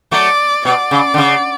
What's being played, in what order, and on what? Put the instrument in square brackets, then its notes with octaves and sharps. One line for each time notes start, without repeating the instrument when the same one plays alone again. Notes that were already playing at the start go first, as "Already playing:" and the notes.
[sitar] F#3 A3 [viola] D5
[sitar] B2 [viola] D5
[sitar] C#3
D3
C#3